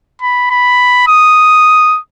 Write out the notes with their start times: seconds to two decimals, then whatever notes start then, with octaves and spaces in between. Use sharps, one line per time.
0.22 B5
0.50 B5
1.08 D#6